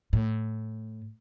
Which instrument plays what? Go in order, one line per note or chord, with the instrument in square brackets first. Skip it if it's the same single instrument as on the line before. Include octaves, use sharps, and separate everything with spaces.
[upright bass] A2